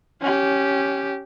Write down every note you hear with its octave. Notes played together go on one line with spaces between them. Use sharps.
C#4 G4